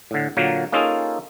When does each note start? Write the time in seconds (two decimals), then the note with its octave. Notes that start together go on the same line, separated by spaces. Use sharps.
0.11 A2 D3
0.37 A#2 D3 F#3 A#3
0.72 A#3 C#4 D#4 F4 G#4 A4